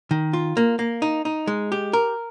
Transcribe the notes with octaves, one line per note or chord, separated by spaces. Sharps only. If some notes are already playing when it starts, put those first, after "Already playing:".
D#3
F4
A#3
A#3
D#4
D#4
G#3
G4
A#4